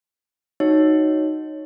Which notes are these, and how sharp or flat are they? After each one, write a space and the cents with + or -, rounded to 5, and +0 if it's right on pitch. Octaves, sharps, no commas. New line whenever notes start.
D#4 +0 F#4 +0 C#5 +0